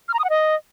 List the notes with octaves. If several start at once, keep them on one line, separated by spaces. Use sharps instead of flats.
F6
A#5
D#6
F#5
D#5